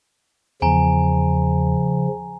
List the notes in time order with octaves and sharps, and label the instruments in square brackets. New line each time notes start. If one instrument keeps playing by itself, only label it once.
[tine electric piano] E2 [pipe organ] C#3 F3 [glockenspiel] G#5 A#5